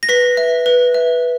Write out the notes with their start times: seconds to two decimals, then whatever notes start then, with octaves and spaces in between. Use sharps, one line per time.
0.03 A#6
0.09 B4 B6
0.37 E5
0.66 B4
0.94 E5